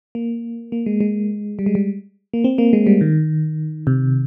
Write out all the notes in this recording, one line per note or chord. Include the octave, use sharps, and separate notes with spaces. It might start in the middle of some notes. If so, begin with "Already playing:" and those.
A#3
A#3
G#3
G#3
G3
G#3
G3
A#3
C4
A#3
G#3
G3
D#3
C3